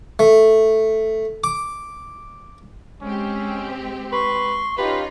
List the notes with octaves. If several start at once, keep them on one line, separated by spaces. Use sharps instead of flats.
A3
D6
G#3 C4 C#4 G4
B4 C6 C#6
C#4 D#4 F4 G4 B4